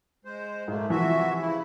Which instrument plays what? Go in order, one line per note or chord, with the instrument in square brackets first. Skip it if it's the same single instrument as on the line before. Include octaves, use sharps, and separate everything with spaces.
[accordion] G#3 C5
[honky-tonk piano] G#2 [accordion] A3 A#3
[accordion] C3 F#4 E5 [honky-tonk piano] E3 F3
[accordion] C#3 E4